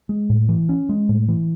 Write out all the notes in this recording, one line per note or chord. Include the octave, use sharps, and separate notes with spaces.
G#3
A2
E3
C#4
G#3
A2
E3